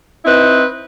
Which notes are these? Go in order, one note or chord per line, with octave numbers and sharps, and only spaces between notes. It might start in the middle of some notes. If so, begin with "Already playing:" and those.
C4 D#4 E4 B4